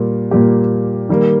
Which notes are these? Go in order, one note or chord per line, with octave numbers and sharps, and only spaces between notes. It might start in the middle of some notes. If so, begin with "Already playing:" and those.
Already playing: A#2 G3 A#3
A#2 G3 A#3 G4
D#3 G3 A#3